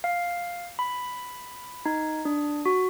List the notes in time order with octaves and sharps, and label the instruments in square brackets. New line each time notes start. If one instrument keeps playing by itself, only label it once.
[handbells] F5
B5
D#4
D4
F#4